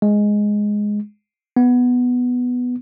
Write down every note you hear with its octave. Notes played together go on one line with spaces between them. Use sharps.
G#3
B3